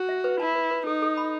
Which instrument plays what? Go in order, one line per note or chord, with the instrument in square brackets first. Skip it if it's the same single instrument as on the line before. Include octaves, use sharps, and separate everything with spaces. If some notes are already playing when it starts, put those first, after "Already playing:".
Already playing: [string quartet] F#4
[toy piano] E5
B4
[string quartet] E4 [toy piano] A5
[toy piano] B4
B4
[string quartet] D#4 [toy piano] A4
[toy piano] A4
B5